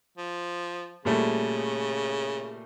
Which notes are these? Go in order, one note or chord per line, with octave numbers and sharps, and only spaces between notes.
F3
A#2 C#3 G3 A3